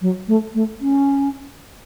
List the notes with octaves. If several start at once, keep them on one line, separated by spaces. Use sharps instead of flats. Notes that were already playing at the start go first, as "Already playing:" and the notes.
F#3
A3
A3
C#4